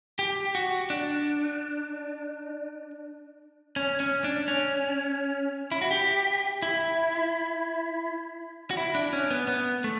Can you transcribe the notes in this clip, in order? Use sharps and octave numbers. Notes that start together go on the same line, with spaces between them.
G4
F#4
D4
C#4
C#4
D4
C#4
E4
F#4
G4
E4
F#4
E4
D4
C#4
B3
B3
A3